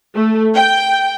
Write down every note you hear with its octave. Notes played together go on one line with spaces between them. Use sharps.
A3
G5